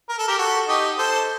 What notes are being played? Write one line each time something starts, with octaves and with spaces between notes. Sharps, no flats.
A#4
A4
G4 A#4
F#4 A4
D#4 G4
A4 C5